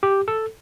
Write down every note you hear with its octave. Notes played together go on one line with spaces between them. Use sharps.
G4
A4